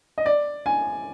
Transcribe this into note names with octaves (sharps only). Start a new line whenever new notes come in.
D#5
D5
G#5